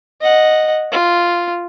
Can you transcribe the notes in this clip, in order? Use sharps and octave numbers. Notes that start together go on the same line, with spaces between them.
D#5 F#5
F4